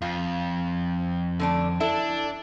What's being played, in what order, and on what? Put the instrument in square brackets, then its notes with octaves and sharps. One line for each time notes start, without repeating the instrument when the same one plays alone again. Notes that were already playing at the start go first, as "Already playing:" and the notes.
[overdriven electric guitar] F2 [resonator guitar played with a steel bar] F4
[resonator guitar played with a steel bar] D3 A3 D4
[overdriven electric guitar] D4 [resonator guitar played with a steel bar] E4 A4